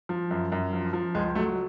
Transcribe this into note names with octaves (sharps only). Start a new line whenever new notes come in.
F3
F#2
F#2
F3
F3
C#2 G#3
F#3 A3